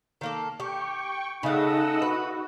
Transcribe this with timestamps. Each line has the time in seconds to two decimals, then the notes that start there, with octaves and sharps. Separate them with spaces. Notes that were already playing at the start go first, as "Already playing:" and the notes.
0.21 D#3 A#3 A4
0.60 G4 G5 C#6
1.43 C#3 A3 D#4 D#5 F#5 E6
2.02 F#4 B4